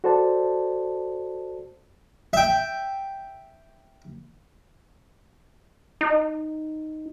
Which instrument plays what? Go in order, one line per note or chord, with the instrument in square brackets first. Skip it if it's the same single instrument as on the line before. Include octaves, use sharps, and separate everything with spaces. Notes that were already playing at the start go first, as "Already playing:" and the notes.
[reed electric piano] F#4 A4 C5 D5 A5
[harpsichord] E5 G5
[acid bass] D#4